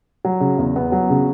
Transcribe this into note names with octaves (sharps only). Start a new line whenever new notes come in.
F#3
C#3
E2
B3
F#3
C#3